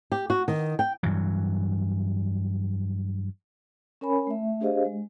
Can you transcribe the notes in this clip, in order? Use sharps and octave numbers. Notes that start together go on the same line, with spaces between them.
G4
F#4
D#3
G5
G2 E3 F#3
C#4 A#4 C#5 G#5 B5
A3 E5
D4 G4 G#4 C5 D#5 F5
G#3